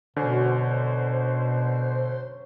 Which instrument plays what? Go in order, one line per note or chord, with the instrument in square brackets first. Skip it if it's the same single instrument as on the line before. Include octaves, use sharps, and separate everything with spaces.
[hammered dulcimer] F#2 C#4 [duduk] B2 [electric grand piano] D3 [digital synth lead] C5